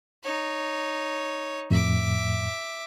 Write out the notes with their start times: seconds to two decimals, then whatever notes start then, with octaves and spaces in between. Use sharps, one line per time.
0.23 D#4 C#5
1.70 F2 A2 E5 D6